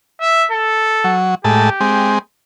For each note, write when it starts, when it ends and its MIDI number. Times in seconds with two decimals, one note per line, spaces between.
0.21 0.46 76
0.51 1.16 69
1.04 1.35 54
1.44 1.70 45
1.44 1.70 56
1.44 2.16 67
1.44 1.70 81
1.81 2.19 56
1.81 2.19 60